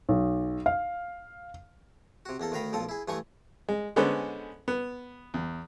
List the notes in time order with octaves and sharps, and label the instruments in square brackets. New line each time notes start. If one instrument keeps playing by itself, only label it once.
[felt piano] B1
F5
[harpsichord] C3 F#4
E2 A#3 A4
D2 D#3 A#4 F5 B5 D#6
B1 A#2 F3 A4 D#6
E4 G#4
G2 E3 A3 G#5 C#6 D#6
[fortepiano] G#3
D3 G#3 B3 C#4 A4 C5
B3
E2